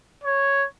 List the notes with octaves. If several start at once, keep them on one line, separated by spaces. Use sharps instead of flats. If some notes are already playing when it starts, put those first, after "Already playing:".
C#5